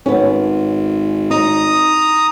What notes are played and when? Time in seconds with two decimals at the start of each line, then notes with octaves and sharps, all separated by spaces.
0.06 G#1 B3 C#4
1.31 D#4 A#5 D#6